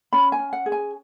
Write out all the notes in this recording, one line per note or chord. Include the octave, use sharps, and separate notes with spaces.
C#4 B5
G#5
C#4
F#5
G#4
G#5